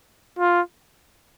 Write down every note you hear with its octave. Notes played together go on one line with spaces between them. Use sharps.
F4